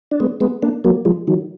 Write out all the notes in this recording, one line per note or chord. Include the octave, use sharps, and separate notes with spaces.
D4
G#3 B3
G#3 B3
A#3 D4
F#3 A#3
F3 G#3
D#3 F#3